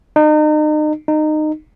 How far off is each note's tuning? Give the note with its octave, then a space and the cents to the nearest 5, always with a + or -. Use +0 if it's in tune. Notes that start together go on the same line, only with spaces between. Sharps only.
D#4 -35
D#4 -20